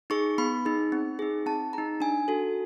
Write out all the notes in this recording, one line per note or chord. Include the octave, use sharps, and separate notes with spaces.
D#4 G#4 C#6
B3 B5
D#4 G#4
C4
D#4 G#4
C4 A5
D#4 G#4 A#5
D4 G#5
F#4 A4